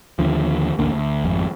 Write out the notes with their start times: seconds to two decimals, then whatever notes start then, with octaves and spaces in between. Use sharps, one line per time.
0.19 D#2 D3 F3
0.79 A1 D2 D3 A#3
0.93 D2
1.25 G#1 F2